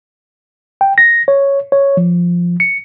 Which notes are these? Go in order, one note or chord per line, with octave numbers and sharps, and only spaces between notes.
G5
A#6
C#5
C#5
F3
C#7